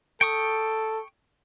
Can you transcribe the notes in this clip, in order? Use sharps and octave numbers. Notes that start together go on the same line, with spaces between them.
A4 G5 C#6 D#6